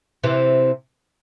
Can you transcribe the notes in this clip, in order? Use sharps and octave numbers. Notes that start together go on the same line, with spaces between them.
C3 E3